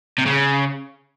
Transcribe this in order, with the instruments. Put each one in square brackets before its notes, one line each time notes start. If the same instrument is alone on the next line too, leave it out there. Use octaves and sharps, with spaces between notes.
[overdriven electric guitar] C3
C#3